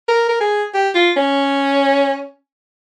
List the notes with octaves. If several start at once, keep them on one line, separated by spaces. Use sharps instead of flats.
A#4
A#4
G#4
G4
F4
C#4